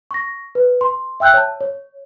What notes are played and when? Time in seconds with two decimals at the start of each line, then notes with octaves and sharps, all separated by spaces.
0.11 C#6 A#6
0.55 B4
0.81 C6
1.20 E5 G5 E6 F#6 G6
1.34 C#5 A5
1.61 C#5